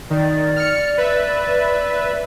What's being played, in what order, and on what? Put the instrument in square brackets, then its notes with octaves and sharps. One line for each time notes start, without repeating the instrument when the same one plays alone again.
[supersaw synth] D#3 [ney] D5
[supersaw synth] F6 C#7
B4 E5